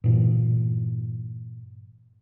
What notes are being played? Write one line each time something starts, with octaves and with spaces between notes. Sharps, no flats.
G2 A#2 E3